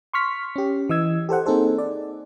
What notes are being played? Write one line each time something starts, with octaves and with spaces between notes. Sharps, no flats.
C6 C#6 F6 B6
C#4 G4
E3 D#5 E6 G#6
G4 A4 C5 F#5
A#3 C4 D#4 G#4 A4 C5
D5